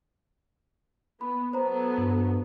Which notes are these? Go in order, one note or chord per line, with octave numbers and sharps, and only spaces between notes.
B3 B5
F#3 B3 A4 C5 A#5
G2